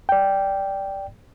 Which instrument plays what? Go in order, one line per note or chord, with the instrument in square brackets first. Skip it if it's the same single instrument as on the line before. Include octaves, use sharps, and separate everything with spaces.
[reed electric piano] D5 G5